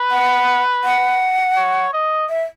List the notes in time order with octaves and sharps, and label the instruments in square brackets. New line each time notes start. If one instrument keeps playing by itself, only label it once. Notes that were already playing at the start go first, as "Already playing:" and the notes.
Already playing: [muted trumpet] B4
[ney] F#5
F#5
[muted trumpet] C#5
D#5
[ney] E5